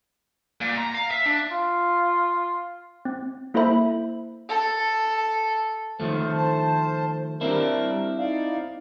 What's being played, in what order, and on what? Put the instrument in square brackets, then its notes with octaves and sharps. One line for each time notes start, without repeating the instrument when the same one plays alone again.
[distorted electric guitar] A#2
A#5
F5
E5
D4
[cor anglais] F4
[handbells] C4
A#3 E4 A4 C5 E5 B5
[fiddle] A4
[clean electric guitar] D#3 F3 A3 [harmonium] C5
[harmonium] C5 A5
[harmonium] G3 A#4 [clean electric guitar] C4 D4 E4
[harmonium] D#4 D5 F5